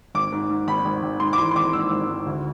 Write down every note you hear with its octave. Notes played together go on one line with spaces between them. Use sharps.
G#1 D6
G#2
G#2
G#1 B5
G#1
G#1
G#2 C6
D6
E3 C6
C6
G#1 D6
G#2 E6
G#1
G#2
D2